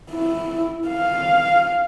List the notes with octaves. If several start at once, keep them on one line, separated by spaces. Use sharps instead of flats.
E4
F5